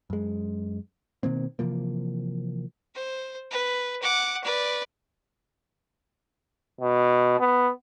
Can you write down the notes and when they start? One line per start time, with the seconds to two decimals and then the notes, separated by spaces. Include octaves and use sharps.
0.10 F#2 G#3
1.23 B2 D#3 A#3 C4
1.59 C3 E3 F3 A#3
2.95 C5
3.51 B4
4.02 F#5 D6
4.44 B4 D5
6.81 B2
7.40 B3